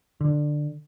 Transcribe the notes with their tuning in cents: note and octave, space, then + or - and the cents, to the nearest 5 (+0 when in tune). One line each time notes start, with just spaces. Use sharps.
D3 +15